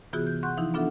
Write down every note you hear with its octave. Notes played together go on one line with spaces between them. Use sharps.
C3 E3 B3 F4 F#4 G#4
G6
F#5 C6 C#6 F#6 G6
E3 F3 D#4 E4
B3 D4 F4 A4 E5 F#5